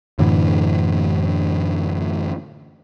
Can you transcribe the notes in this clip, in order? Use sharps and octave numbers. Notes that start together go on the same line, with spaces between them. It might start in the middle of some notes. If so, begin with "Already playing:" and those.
F#2 A2 D3 E3